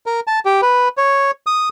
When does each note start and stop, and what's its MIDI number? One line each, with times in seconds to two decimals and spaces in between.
0.06 0.20 70
0.27 0.39 81
0.45 0.61 67
0.62 0.88 71
0.97 1.31 73
1.47 1.69 87